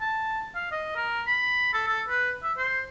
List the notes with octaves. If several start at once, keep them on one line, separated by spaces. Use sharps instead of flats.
A5
F5
D#5
A#4
B5
A4
A4
B4
E5
C5